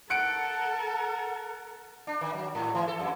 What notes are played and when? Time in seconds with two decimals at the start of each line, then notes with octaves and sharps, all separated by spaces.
0.10 A4 A#4 F#5 F#6 C#7 D7
2.07 D4
2.21 D#3
2.33 F#3
2.55 G#2
2.75 E3
2.88 A4
2.99 F2